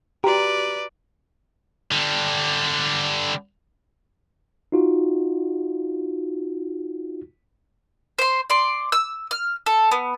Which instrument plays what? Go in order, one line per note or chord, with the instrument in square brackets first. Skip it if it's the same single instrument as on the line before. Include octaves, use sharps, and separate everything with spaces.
[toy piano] F#4 A#5 [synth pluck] G4 [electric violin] B4 D5
[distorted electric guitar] D3 G3
[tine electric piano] D#4 F4 F#4
[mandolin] C5 C6
D5 C6
E6
F6
A4
B3